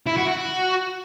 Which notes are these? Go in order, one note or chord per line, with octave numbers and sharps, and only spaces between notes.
E4
F#4
F#4